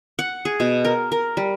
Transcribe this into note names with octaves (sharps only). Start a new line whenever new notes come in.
F#5
G#4
B2
A#4
A#4
G3